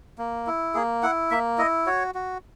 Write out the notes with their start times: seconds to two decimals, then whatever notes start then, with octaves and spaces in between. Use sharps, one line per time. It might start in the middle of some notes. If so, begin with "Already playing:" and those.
0.18 A#3
0.47 E4
0.74 A#3 G#4
1.03 E4 F#5
1.31 A#3 E5
1.58 E4 D#5
1.86 F#4 C#5
2.15 F#4